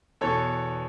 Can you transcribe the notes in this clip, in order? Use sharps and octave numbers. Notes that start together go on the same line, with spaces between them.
E2 B2 A4 C#5